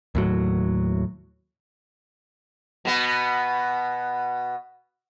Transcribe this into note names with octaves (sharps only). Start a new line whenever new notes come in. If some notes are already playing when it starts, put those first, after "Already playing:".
D#2 A2 F#3
B2 B3